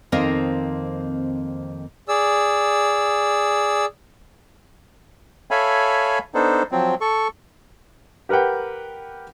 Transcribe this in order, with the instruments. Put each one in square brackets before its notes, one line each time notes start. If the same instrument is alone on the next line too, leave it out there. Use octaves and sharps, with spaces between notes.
[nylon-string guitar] F2 D#3 A#3 C4 A#4 D#5
[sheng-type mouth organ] G#4 D5 E6
[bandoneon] A4 C#5 E5 F5 G#5 B5
B3 D4 D#4 A4 C5
F3 F#3 C4
A4 C#6
[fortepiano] G4 A#4 B4 F#5 G5